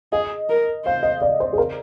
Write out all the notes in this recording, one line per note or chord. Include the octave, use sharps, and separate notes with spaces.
G#4 D#5
A#4
C5 F5
D#5
D5
C5
G#4
A#4